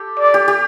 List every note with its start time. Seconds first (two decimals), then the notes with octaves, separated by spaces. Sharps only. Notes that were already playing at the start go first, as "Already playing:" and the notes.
Already playing: G4 A4
0.19 D5
0.34 G4
0.48 G4